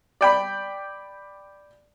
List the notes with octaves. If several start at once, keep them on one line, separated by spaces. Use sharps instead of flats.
D5 G5 B5